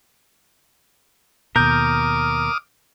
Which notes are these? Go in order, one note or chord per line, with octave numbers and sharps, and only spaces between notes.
D#2 B2 A#4 D6 D#6 F6 G6